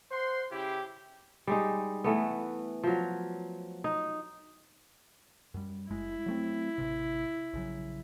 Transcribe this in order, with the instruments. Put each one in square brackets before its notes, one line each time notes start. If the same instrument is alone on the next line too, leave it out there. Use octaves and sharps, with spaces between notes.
[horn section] C5 F#5 C6
C#3 E4 G4
[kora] G3 G#3 D#4
E3 A3 B3
F3 F#3
D#4
[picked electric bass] F#2 G3
[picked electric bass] F#1 G#3 [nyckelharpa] E4
[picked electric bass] F#3 A3 C4
A1 C3
A#1 C#3 F#3